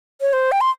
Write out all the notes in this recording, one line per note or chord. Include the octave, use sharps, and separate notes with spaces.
C#5
C5
G5
C6